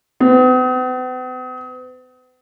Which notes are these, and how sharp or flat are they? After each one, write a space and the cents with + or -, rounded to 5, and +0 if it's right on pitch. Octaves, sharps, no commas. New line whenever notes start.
B3 +45